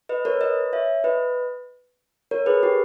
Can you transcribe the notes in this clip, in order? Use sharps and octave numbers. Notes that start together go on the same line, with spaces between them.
B4 D#5
A#4 C#5
B4 D#5
C#5 E5
B4 D#5
A#4 C#5
G#4 B4
G4 A#4